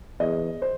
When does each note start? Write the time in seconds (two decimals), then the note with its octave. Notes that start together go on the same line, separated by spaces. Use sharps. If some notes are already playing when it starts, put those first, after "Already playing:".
0.20 E2 D#5
0.62 C5